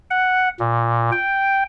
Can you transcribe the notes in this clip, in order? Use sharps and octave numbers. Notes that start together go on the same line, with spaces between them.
F#5
A#2
G5